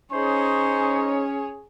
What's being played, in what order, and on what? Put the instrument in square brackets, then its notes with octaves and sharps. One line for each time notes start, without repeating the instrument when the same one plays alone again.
[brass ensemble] C#4 [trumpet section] D#4 C5 C#6 [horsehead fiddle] G#4 C#5